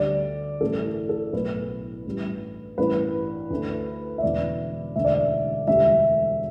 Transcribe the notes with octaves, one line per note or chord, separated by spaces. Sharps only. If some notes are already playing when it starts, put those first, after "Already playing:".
Already playing: D2 D3 G3 D5
A1 G2 E3 A3 A4
A4
B1 A2 A3 B4
A1 G2 G3
A1 G2 E3 B4
D2 D3 A3
E5
E1 E2 D3 D5
E1 D2 D3 E5
D5
E5
E1 D2 D3 G3 E5